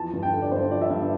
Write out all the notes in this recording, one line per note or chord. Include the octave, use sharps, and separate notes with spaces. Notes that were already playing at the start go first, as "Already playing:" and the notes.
Already playing: E2 F3 A5
G2
G5
D3
D5
G2 C5
F3 D5
E5
G2